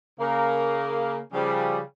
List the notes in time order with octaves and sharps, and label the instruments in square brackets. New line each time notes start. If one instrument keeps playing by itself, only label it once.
[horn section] C#3 A#3 A#4
C#3 F3 G3